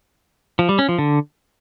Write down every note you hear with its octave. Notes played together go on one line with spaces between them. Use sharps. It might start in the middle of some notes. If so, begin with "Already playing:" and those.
F3
G3
C#4
F3
D3